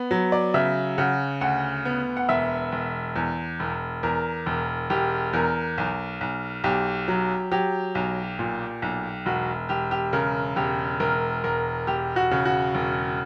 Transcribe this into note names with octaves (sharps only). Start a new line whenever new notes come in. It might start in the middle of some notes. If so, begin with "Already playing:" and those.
Already playing: B3
F#3
D5
C#3 E5
C#3 F#5
D2 F#5
B3
F#5
E1 E5
E1
E2
E1
E2 A#4
E1
E1 G4
E2 A#4
B1
B1
B1 G4
F#3
F#3 G4
B1
A#2
B1
E1 F#4
E1 G4
G4
C#3 A#4
E1 G4
E1 A#4
E1 A#4
E1 G4
F#4
C#3
F#4
E1